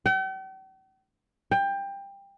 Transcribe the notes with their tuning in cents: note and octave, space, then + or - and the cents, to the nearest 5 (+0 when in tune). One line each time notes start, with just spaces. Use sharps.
G5 -45
G5 +20